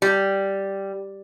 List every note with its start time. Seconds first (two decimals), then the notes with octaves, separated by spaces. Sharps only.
0.02 G3